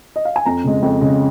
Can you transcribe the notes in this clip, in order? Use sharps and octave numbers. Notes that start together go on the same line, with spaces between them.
D#5
F5
G#5
F2 A#5
C#3 G#3
F2
C#3 G#3